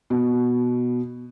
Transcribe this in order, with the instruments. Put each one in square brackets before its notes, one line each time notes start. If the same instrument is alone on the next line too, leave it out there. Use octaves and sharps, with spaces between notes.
[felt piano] B2